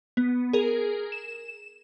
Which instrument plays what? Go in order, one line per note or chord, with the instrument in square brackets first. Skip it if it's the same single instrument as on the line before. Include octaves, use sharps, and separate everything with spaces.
[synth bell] B3
G#4 A#4
E7